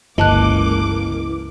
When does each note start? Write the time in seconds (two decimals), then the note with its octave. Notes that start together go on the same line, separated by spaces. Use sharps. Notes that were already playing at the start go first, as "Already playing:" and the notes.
0.18 G1 C#2 E3 A#3 D#5 A5 D6 F#6